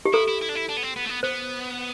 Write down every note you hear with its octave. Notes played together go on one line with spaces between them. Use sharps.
G4
E4 A4
E4
E4
D4
E4
D4
B3
C4
B3
A3
B3
B3 C5